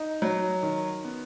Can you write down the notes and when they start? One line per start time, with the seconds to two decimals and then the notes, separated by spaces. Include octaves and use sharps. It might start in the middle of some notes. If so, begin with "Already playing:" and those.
Already playing: D#4
0.22 F#3
0.63 D#3
1.05 B3